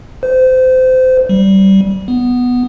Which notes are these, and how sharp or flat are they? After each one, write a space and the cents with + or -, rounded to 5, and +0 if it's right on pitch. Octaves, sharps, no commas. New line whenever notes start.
C5 -25
G3 -20
B3 +0